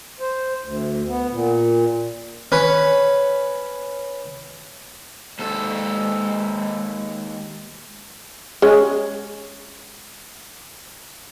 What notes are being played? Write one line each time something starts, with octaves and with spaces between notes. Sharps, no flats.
C5
D2
B3
A#2
C#4 B4 C#5
D#2 G#3 A4
G#3 C#4